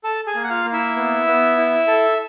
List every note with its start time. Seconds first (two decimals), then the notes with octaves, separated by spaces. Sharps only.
0.04 A4 A5
0.27 G#4 G#5
0.35 A#3
0.44 F#5
0.50 F4 F5
0.65 A#3
0.73 E4 E5
0.97 B3
1.27 B3
1.58 E4
1.87 A4